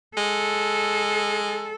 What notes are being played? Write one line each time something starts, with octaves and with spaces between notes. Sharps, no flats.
G#3 A4